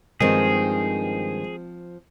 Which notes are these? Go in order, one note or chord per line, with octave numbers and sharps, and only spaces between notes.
G2 D#3 F3 G#3 C4 G#4